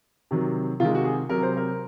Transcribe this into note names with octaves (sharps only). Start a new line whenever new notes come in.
C3 D#3 F#3
C3 D#3 G#3 F4
F#4
G#4
C3 F#3 A#4
C5
A#4